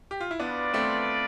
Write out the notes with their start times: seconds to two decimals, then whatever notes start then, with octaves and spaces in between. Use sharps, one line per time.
0.11 G4
0.20 F4
0.31 E4
0.40 B3 D4 F4 B4 D5
0.74 A3 C4